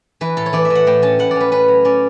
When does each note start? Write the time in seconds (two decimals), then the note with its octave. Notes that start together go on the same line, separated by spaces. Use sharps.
0.21 E3 B4
0.37 A2 A4
0.46 C#5
0.53 E3 D5
0.65 E5
0.70 A2
0.75 F#5
0.87 A2 G5
1.02 C#4 A5
1.19 A2 F#5
1.31 D5
1.36 C#4 B4
1.51 C#4 B4
1.68 F#3
1.85 C#4 D5